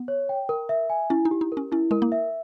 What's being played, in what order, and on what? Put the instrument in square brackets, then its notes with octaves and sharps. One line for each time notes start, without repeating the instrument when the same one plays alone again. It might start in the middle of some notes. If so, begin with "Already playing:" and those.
Already playing: [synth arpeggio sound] B3
[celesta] C#5
G5
A#4
E5
G#5
[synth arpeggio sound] C#4 [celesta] E4
[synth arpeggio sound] D#4
[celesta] G4
[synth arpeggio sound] D#4
[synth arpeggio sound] C#4 [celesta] A#4
[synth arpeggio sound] C#4 [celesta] E4
[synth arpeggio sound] G#3 [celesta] A#4
[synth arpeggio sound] A#3
[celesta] E5